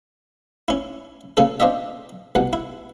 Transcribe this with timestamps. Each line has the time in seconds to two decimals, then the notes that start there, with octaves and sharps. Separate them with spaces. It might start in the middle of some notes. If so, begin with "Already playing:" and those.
0.68 C#4 E4
1.37 A#2 C#3 C#4 A4
1.60 C4 D4 F4 D#5 E5
2.35 C2 B2 F#5
2.53 E4